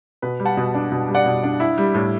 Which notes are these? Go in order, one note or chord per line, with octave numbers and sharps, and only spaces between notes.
B2 B4
G3
F#5 A5
B2
D4
B2
G3
D5 F#5
B2
D4
E4
G3
A2